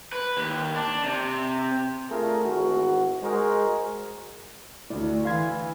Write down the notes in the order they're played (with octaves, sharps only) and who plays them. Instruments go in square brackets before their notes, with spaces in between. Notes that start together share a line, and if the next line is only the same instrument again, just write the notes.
[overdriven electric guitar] B4
D#2
D4
C3
[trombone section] A3 D4 F4 G#4 A#4
G#1 E2 G#2 F#4
G#3 F#4 G#4 A#4 C5
[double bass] D2 [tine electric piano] A3 E4 D5
[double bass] E3 [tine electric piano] F5 C6 G#6